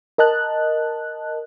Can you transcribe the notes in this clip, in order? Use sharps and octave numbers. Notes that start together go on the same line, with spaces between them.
A#4 D#5 A5 F#6